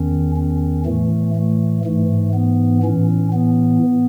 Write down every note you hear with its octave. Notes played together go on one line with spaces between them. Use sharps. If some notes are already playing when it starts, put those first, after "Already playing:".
Already playing: E2 D#3 C#4
C#4
A2 E3 A3
A3
G#2 E3 A3
B3
A2 E3 C#4
B3